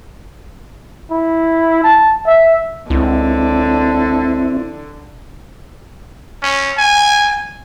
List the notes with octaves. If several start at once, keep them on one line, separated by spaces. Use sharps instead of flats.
E4
A5
E5
C#2 D3 C4 E4
C#4
G#5